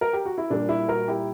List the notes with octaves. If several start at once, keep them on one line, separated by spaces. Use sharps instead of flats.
A#4
G4
F#4
E4
A#2 G3 A#3 D4
E4
F#4 A#4
E4 G4